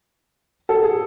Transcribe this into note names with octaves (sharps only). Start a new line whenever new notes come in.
A4
G#4